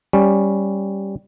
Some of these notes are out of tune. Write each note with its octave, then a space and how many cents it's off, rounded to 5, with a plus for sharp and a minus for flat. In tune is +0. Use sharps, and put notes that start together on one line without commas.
G3 +0 C#4 +0